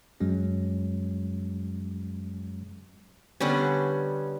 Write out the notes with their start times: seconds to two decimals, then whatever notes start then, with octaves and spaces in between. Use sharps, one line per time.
0.20 F#2 F#3 G#3 C#4
3.40 D3 G3 B3 C#4